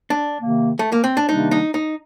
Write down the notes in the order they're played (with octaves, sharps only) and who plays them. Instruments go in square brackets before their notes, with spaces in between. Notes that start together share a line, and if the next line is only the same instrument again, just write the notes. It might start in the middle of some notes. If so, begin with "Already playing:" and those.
[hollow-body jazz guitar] D4
[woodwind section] C3 D#3 A#3
[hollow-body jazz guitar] A3
A#3
C4
D4
[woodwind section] C3 D#3 G3 A#3 D4 [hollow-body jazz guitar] D#4
[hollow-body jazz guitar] D#4
D#4